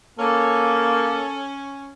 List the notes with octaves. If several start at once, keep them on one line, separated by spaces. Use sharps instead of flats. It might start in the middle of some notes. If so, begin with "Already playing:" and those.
A#3 C#4 A4